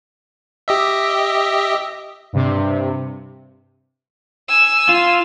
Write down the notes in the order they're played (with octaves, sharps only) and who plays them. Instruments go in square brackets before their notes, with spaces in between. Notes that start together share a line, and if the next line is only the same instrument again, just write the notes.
[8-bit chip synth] G4 D#5 E5
[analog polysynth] G2 C3
[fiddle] G#5 E6
[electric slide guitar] F4